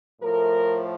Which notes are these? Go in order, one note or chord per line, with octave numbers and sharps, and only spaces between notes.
A2 F3 A3 A#4